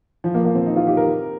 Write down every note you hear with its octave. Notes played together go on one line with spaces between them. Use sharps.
F3
A#3
A#3
C4
D#4
F4
G4
A#4